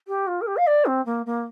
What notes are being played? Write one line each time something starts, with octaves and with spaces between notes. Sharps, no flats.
G4
F4
A#4
G4
F5
D5
C4
A#3
A#3